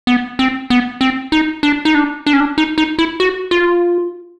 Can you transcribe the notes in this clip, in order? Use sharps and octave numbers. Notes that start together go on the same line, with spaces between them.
B3
C4
B3
C4
D#4
D4
D#4
D4
D4
C#4
D4
D#4
D#4
E4
F#4
F4